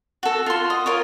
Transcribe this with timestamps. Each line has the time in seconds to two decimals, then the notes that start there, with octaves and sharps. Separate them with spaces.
0.23 F#4 A4
0.46 F4 C6
0.70 D#5
0.86 F4 A#4 C#5